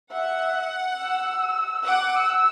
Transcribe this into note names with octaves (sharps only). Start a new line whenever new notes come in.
E5 F#5
E6
F#5 D6
E6